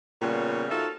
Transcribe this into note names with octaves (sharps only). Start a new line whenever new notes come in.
A#2 C#3 G3 B3 G4 C#5
D#4 F4 F#4 A4 C5 E5